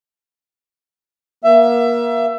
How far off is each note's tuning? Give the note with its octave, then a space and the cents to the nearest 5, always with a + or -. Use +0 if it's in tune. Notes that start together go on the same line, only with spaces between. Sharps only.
A#3 +30 E5 +20